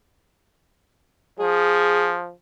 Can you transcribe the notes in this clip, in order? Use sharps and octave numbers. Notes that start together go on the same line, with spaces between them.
F3 G#4